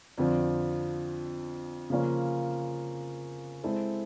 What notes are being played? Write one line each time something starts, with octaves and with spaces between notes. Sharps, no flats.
F2 D3 F3
C#3 F3 A#3 C#4 F4
G#3 C4 E4 A4